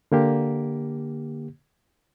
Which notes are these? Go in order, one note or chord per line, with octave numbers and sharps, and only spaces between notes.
D3 A#3 G4